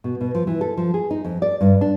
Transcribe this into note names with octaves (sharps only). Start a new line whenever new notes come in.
B2
B2
F3
E3
A4
F3
G#4
D#4
F2
D5
G2
D4